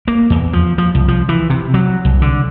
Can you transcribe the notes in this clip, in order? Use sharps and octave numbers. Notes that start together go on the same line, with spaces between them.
A#3
E2
F3
F3
C2
F3
E3
C3
F#3
C2
D3